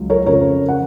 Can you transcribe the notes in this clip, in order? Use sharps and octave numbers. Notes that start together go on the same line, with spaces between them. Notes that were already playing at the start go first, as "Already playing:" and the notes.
Already playing: C#2 F#3
A#4 C#5
F2 C#3 F3 A#4 C#5
F#5